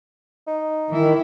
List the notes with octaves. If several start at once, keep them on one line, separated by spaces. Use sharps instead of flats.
D#4
D#3 E3 E4